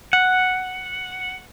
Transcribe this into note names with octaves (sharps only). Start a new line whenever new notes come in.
F#5